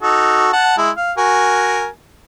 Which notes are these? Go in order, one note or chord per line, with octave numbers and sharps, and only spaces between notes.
D#4 F#4 A4
F#5 A5
G#3 E4
F5
F#4 A#4 G#5